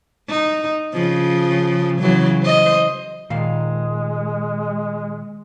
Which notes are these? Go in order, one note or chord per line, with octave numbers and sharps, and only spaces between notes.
D#4
C#3 F3
C#3 E3 F#3
C5 D#5
A#2 D#3 G#3 F5